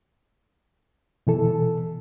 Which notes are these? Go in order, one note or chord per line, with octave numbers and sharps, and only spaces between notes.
B2 E3 A4